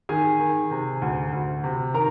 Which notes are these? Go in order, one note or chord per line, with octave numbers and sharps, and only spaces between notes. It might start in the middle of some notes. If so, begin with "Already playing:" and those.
D#3 G#4 G#5
D#3
C3
D2
D2
C3
D#3 A#4 A#5